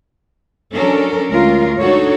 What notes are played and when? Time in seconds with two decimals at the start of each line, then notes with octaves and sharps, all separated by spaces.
0.74 F#3 C#4 D4 A4 A#4
1.31 D2 G#3 C#4 F4 A#4
1.80 D4 D#4 F#4 A4 C#5